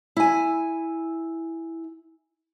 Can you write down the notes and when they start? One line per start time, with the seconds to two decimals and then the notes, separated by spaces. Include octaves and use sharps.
0.17 E4 G#5